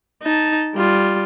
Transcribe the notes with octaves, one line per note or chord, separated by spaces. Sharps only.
D#4 A5
G3 F4